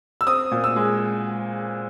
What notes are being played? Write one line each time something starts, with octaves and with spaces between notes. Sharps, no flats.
E6
C4 D#6
A#2
E6
G#3